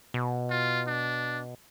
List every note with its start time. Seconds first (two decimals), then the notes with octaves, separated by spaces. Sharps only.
0.14 B2
0.50 F4
0.87 D4